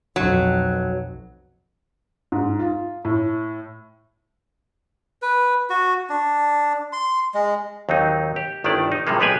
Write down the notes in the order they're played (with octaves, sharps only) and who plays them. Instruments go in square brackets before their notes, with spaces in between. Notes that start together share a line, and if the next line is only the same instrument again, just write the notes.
[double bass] B1 F2 [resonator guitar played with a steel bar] F#3
[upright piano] G#2
F4
A2
[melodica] B4
F#4
D4
C6
G#3
[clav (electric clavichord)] D#2 F#3 C4 D#4
G4
G1 D#3 A3 D4 E4 D5
D#4
A2 C3 F3 G3 G#3 A#3
B1 B3 G4 G#4 B4 G#5